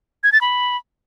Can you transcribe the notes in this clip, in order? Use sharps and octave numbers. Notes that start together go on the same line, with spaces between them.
G#6
A6
B5